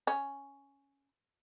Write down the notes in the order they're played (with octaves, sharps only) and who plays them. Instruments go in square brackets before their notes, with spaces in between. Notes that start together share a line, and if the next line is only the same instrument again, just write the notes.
[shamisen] C#4